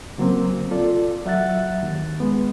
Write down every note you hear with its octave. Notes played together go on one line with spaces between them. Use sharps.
C#3 F#3 A#3 C4
F4 A4 D5
F#3 E5 F#5 F#6 A6
D#2
G#3 B3